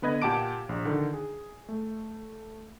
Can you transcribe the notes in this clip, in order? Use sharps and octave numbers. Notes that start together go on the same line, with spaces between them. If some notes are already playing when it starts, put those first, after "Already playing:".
D3 B3 B4 D#5 G#6
A#2 G4 F#5 A5 D6 D7
A#1
D3 D#3
G#4
A3